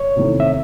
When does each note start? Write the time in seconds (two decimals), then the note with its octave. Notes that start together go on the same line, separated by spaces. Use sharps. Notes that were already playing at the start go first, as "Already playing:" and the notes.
Already playing: C#5
0.16 E2 C3 D#3 A3 C4
0.40 E5